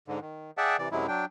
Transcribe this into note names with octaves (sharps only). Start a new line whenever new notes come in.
G#2 D3
D#3
G#4 D5 E5 F#5 G5 A5
C3 E3 D5
F#2 C3 F#3 G#3 E4
F#3 D4 G5